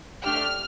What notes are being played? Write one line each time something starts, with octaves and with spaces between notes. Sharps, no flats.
A3 D4 G4 F6